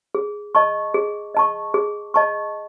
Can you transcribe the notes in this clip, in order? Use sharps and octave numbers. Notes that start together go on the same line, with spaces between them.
G#4
D#5 A5 C#6
G#4
D#5 A5 C#6
G#4
D#5 A5 C#6